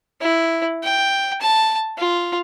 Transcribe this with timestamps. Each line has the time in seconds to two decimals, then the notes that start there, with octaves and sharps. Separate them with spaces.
0.21 E4
0.83 G5
1.41 A5
1.98 F4